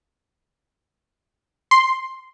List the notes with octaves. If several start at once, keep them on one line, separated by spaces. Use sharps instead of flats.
C6